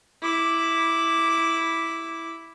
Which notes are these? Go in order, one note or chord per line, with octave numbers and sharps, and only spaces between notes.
E4 D6